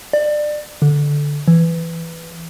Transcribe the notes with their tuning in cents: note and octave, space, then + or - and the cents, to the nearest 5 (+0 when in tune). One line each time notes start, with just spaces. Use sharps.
D5 +25
D3 -10
E3 +10